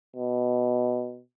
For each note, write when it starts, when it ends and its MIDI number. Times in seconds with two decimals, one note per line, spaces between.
0.16 1.20 47